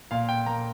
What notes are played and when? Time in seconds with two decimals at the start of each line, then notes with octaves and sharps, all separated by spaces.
0.11 A#2 F5
0.29 G5
0.46 A#3 A#5